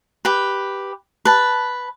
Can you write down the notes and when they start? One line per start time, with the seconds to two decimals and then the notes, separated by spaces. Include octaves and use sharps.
0.25 G4 B4
1.25 B4 A5